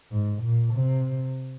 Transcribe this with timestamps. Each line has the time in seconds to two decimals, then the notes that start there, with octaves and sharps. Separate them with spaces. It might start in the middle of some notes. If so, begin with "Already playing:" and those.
0.11 G#2
0.42 A#2
0.73 C3